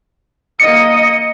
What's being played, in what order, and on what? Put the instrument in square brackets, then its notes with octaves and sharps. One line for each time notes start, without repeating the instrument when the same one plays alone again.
[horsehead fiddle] A#3 D#5 [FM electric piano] C#7